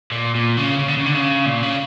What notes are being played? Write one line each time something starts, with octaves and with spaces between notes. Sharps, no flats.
A#2
A#2
C#3
C#3
D3
C#3
D3
C#3
A#2
C#3